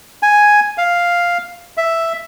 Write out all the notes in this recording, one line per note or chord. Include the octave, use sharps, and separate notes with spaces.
G#5
F5
E5